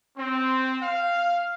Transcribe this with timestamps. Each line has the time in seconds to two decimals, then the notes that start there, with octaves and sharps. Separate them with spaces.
0.17 C4
0.82 F5